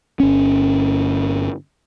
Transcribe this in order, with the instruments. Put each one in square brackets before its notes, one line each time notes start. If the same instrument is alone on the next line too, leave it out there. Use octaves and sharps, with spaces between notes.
[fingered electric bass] G1 C#4